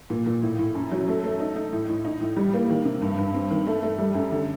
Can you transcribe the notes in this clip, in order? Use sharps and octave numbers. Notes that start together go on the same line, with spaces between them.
A#2
A#2
A2
A2
F#2
F#3
A3
A3
D#4
D#4
A2
A2
D#4
A2
G3
A#3
D#3
C3
G2
G2
C4
D#3
A3
A3
G3
F#2
D3